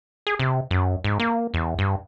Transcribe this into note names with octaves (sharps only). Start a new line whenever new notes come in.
G#4
C3
F#2
G#2
A#3
E2
G2